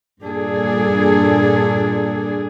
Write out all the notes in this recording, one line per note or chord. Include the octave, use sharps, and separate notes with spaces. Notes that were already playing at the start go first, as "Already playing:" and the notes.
G2 A#2 D4 G#4 A4